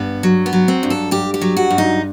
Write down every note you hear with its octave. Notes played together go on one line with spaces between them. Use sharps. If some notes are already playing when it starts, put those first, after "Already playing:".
Already playing: G2 B3
F#3
B3
F#3
C4
G2
A4
G2 G4
G4
F#3
F#4
G2
D#4